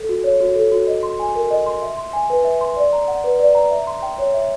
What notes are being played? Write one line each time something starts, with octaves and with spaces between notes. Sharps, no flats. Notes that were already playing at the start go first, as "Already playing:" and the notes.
Already playing: A4
F#4
C#5
F#4
A4
F#4
D#5
C6
G#5
A#4
D#5
C6
E5
C6
G#5
B4
E5
C6
D5
A#5
F#5
B4
D5
A#5
E5
C6
G5
C#5
E5